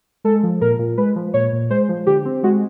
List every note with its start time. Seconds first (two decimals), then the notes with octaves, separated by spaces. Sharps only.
0.24 G#3 A4
0.43 F3
0.61 A#2 A#4
0.79 A#2
0.98 G#3 B4
1.16 F3
1.34 A#2 C#5
1.52 A#2
1.70 G#3 C5
1.89 F3
2.06 D3 G4
2.25 C4
2.43 G#3 F#4